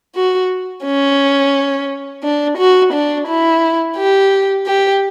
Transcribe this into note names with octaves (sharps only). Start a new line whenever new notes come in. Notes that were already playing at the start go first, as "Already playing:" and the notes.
F#4
C#4
D4
F#4
D4
E4
G4
G4